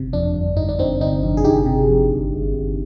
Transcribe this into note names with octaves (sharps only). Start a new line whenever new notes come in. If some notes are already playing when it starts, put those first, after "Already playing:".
Already playing: G1 C3
F2 D4
G1
G1 D#4
D4
G1 C4 D#4
G1 C4 D#4
F2
G#4
G1 D#4 G4
C3
F2
G1
G1
G1